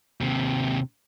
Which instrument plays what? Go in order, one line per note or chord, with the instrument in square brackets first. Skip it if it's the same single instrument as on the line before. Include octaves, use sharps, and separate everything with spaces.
[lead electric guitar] D#2 C3